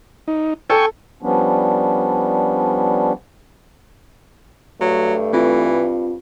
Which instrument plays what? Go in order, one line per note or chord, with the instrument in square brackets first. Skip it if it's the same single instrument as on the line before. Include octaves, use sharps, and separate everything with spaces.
[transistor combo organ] D#4
[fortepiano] A4 [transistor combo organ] G5 G#5 C#6
[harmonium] F3 G3 B3 C#4 D4
[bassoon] G2 [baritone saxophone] F#3 [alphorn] A3
[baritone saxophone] E3 [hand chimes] C4 F4